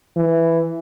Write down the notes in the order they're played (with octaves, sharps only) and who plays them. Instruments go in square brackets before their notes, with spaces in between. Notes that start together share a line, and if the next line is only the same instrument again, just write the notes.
[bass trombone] E3